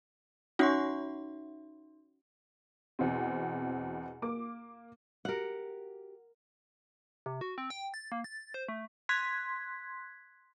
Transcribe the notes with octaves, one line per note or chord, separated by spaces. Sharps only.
C#4 D#4 F#4 E5 C6
E2 B2 C4
A#3 D6
F#4 G4 A#4 F#5
C3
F#4
C4
G5
A6
A#3
A6
C5
A3
C6 F#6 G#6 B6